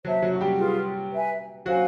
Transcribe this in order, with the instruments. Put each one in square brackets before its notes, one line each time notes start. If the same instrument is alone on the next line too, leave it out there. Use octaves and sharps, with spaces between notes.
[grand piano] F#3 F#4 [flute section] C5 E5 A5
[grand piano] F#3 F#4
F#4
G3 G4
[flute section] F4 G#4 B4
B4 E5 G#5
[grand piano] F#3 F#4 [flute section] C5 F5 G#5